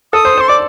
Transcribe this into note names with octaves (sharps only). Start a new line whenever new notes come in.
A4 D#6
C5
C5 C6
D5 D6